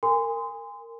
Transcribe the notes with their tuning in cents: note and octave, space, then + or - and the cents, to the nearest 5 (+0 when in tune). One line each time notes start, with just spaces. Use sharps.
A#4 -20 G#5 -25 C6 -25